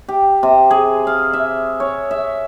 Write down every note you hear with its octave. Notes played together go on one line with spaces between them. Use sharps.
G4
C3
G#4
F5
E5
C#5
E5